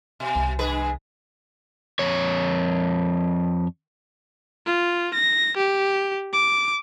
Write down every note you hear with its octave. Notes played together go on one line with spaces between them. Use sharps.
B2
C2 D#3
G2 G#4 B4
F2 C#5
F4
A#6
G4
D6